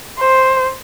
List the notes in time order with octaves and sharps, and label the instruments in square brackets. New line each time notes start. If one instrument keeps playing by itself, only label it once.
[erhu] C5